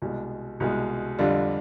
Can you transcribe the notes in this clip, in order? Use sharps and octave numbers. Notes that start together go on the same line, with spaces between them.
C2 B2 G#3
C2 B2 G#3
F2 D3 G3 D4 F4